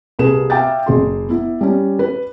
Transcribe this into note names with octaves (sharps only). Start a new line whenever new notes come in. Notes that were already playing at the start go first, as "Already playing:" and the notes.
C2 A#3 G4 G#4 B4 E7
E5 F5 G5 D6 A6
F#1 G#4 C6
B3 E4
G3 C#4
B4